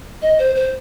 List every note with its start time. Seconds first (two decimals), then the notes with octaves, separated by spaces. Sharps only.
0.22 D#5
0.39 C5
0.55 C5